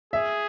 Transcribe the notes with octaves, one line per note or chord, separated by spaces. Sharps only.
G#4 E5